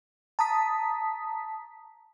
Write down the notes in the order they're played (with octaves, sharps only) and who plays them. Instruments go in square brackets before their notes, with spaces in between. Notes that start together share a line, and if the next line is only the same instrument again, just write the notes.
[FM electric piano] A5 A#5 D#6 B6